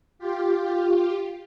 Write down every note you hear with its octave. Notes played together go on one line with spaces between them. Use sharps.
F4 G4